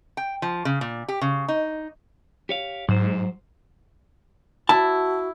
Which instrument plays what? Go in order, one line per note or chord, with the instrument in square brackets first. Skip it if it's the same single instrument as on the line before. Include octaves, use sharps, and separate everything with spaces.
[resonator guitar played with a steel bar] G5
F3
C#3
A#2
G4
C#3
D#4
[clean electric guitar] G4 C#5 F5
[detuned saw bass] G#2 [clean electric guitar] F#3 C5
[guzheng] E4 [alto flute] F#4 [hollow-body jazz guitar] A5